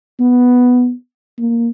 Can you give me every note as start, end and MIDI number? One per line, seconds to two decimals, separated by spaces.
0.20 0.92 59
1.38 1.68 58